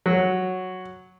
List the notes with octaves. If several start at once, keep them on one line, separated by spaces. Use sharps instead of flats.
F#3